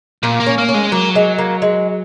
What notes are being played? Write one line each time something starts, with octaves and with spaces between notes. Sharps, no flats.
A#2 A#3
A#3
C#4
A#3
C#4
G#3
F#3 A#3
G#3
A#3
G#3